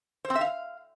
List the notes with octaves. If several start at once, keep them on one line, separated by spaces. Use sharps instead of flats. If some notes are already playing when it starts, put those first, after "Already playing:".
C5
C4
E5
F5